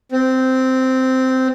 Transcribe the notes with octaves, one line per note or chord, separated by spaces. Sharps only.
C4